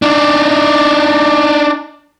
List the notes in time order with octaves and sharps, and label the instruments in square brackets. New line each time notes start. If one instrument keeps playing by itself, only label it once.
[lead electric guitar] D4 D#4